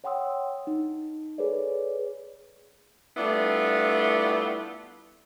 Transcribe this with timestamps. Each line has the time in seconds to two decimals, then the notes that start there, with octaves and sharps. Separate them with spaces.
0.04 C#5 F#5 G5 C6 D#6 E6
0.67 D#4
1.38 G#4 A4 B4 C#5 D5
3.17 G3 A3 B3 D4 E4 F4